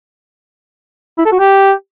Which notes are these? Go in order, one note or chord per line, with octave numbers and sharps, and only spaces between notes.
E4
A4
F#4
G4